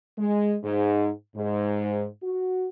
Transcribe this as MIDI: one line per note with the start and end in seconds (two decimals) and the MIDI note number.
0.19 0.56 56
0.64 1.10 44
1.36 2.06 44
2.23 2.69 66